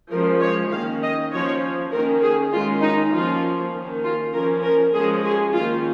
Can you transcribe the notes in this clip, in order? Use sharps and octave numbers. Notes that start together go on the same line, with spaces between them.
F3 G#3 C#4 A#4
C#5
D#3 A#3 C#4 F5
D#5
F3 C#4 C#5
D#3 A#3 C#4 A#4
G#4
D#3 G#3 C#4 F4
D#4
F3 A#3 C#4 F4
D#3 A#3 C#4
F4
F3 C#4 A#4
A#4
F3 G#3 C#4 G#4
G#4
D#3 A#3 C#4 F4